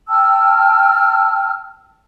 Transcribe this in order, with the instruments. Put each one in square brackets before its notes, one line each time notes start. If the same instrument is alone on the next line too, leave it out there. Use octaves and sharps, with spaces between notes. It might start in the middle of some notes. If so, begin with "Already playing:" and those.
[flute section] G5 A5 E6 F6